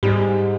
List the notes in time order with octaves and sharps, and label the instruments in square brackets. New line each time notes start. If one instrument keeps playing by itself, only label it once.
[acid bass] G#2 [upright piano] G3